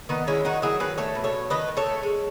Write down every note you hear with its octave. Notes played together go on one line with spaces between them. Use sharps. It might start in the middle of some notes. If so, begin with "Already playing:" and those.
D#3 B3 D#4
G#3 C#4 E4
D#3 D#4 F#4
F#3 E4 G#4
D#3 G#4 B4
A3 A4 C#5
B2
A4 C#5
A3
D#3 B4 D#5
D#3
A4 C#5
A3
G#3